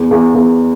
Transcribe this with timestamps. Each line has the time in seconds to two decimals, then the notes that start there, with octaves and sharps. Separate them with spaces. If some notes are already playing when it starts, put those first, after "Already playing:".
Already playing: E2
0.11 E2
0.35 E2